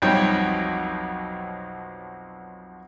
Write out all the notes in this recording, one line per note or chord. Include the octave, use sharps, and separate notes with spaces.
B1 F2 G3 D#4 C#5 G5